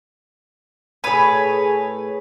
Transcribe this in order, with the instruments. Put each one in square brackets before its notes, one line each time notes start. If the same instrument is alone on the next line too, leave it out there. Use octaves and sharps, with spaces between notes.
[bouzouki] A2 G#4 [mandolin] B4 C#5